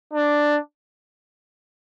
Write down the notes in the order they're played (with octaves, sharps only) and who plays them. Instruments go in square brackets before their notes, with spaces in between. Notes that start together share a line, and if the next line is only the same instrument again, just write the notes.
[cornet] D4